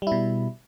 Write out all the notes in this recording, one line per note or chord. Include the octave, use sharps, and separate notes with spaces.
B2 G3 E4